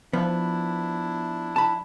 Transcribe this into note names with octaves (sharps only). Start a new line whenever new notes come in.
F3 B3 D4 E4
A5 B5